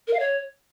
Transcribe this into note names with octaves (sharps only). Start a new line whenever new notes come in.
A#4
F5
C#5